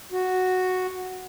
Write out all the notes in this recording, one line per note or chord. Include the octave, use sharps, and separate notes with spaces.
F#4